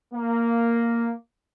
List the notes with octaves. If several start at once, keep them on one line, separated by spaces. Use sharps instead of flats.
A#3